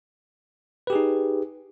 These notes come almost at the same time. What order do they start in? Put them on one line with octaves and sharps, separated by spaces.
B4 G4 G#4 D#4